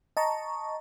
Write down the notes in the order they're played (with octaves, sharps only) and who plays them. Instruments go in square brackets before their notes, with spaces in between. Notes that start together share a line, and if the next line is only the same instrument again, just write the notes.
[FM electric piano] D#5 A5 A#5 C#6